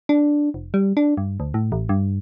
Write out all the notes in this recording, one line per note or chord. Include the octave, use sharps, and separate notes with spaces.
D4
F1
G3
D4
G2
D2
A2
A1
G2